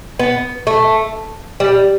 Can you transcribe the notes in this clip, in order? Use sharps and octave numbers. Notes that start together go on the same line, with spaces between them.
B3
A3
G3